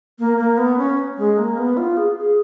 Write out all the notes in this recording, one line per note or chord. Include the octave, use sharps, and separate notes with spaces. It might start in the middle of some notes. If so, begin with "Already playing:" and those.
A#3
A#3
B3
C#4
G#3
A#3
B3
F4
G#4
G#4